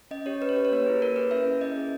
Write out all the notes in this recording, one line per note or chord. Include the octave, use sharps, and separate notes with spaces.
C#4 D#5
G4 C#5
C#4 B4
C#5
G4 B4
C#5
A#3 B4
E4 G#4
A#3 A#4
E4 G#4 B4
C#4 E5
G#4
C#4 D#5
G#4